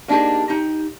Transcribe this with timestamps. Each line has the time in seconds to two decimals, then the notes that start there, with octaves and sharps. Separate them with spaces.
0.08 A#3 D4 D#4 G4 G#4
0.49 D#4 G4